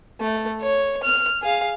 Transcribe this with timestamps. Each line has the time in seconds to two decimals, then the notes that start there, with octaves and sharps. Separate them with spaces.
0.20 A3
0.62 C#5
1.04 F6
1.42 G#4 F5